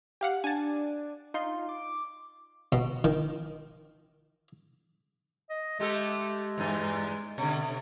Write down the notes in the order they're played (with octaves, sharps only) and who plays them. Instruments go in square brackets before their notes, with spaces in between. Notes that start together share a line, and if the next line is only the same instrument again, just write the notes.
[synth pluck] G4 F5 F#5
[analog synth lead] D4 [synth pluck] G#5 A5
[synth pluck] D#4 C6 [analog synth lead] F4
[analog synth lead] D6
[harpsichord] B2
D#3
[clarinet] D#5
[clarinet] G#3 [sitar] A3 G4 A4
[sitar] E2 G2
B2 D3